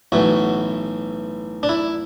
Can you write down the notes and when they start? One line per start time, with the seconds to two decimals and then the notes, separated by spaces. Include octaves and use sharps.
0.12 B1 A2 E3 F#4
1.63 D4
1.69 E4